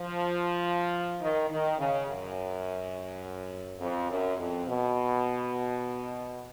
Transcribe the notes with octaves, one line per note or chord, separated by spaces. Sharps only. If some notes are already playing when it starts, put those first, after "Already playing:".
Already playing: F3
D#3
D#3
C#3
F#2
F2
F#2
F2
B2